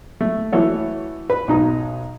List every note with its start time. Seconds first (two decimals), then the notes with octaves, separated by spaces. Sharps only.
0.21 A3
0.52 E3 A3 F#4 A4 C#5
1.30 B4 B5
1.48 B1 G#2 D#4 F#4 A#5